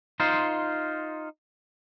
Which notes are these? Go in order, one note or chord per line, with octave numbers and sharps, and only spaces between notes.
D#4 F4 C5